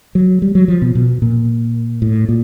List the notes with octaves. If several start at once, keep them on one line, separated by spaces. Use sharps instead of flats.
F#3
G3
F#3
F3
B2
B2
A#2
A2
A#2